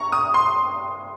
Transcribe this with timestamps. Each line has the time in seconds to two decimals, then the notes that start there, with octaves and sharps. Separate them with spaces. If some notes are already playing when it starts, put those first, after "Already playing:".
Already playing: A#5 C#6
0.12 D#6
0.34 C6